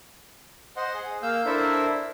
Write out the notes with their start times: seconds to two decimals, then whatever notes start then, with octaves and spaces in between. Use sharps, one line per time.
0.77 C5 D#5 F#5 C6
0.94 G#4
1.23 A#3 F5 E6 G6
1.45 D4 E4 A4 A#4 C5 E5